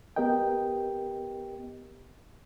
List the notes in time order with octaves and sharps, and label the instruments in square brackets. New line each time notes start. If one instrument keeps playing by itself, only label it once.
[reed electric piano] B3 G4 A#4 D#5 G5